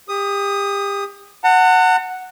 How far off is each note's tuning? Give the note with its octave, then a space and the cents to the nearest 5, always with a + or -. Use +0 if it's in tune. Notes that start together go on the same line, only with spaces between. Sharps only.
G4 +30 D#6 +0
F#5 +0 A5 +45